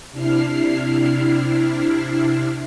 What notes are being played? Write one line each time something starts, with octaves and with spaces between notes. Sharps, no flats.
C3 D4 E4 F6 C7